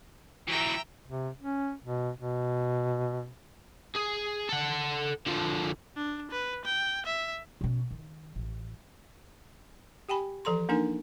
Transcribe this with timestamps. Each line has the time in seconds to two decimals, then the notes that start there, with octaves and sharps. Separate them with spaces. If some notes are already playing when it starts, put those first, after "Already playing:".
0.47 E3 F#3 E5 G5 A#5
1.08 C3
1.41 C#4
1.84 B2
2.19 B2
3.95 G#4
4.49 A4 F#5
5.26 D3 F3
5.96 D4
6.31 B4
6.65 G5
7.06 E5
7.61 B2 C#4
7.91 D#3
8.36 A1
10.09 G4 G5 G#5 B5
10.45 E3 F3 A4 A#5 C6
10.69 A#3 D4 D#4 A#4 G#5